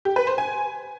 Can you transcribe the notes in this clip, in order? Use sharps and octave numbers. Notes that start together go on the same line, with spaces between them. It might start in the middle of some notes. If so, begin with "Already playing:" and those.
G4
B4
C5
G#5